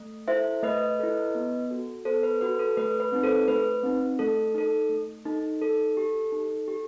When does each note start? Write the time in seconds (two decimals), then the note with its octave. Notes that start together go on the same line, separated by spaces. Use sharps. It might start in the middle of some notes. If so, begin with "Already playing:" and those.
Already playing: A3
0.28 E4 A4 C5 E5
0.63 A3 B4 D#5
0.99 E4 A4
1.35 B3
1.70 F#4 A4
2.05 B3 A4 C5
2.23 B4
2.41 F#4 A4 B4
2.59 A4
2.77 A3 B4
3.00 B4
3.12 C4 D#4
3.24 A4 C5
3.48 A3 B4
3.83 C4 D#4
4.19 A3 A4
4.54 D#4 A4
4.90 A3
5.25 D#4 A4
5.61 D#4 A4
5.97 G4
6.32 D#4
6.68 G4